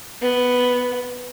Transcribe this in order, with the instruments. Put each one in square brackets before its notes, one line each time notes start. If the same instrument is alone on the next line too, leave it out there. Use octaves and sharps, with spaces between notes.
[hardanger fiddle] B3